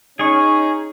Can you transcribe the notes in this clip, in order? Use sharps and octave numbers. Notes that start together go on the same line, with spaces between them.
C#4 D#4 G#4 C#6